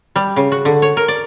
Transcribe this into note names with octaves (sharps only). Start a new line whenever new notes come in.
G3
C#3
F#4
D3
C#5
A#4
D5